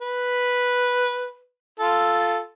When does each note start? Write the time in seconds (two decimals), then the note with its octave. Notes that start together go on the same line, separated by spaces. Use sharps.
0.01 B4
1.80 F4 A4